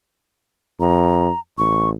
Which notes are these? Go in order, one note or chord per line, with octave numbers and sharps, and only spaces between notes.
F2 A#5
A1 C#6